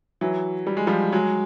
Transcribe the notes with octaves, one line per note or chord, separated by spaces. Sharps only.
E3 F#3
G3
G#3
F3 G3
F#3 G#3